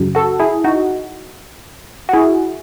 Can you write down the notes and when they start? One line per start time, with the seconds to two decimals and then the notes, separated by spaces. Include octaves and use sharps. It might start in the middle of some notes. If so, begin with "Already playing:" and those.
Already playing: F#2 C#3 F#3
0.15 F#4 A4
0.40 E4 G#4
0.64 D#4 F#4
2.09 F#4
2.13 E4 G#4